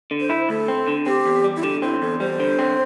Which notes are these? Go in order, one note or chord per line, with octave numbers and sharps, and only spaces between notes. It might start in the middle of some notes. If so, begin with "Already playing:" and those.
D3
C5
E4
D2 A4
C4
D3
C4 G4
E2
G3
E4
D3 G4
C4 E4
E2 A4
G3 C5
D3
C4